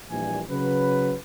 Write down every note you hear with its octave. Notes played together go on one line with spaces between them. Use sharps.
A#1 A#2 E3 G3 G#5
C#3 F#3 B4